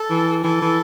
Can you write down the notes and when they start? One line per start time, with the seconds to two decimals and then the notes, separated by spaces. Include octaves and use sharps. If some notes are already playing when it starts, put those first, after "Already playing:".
Already playing: A4
0.10 E3
0.44 E3 A4
0.62 E3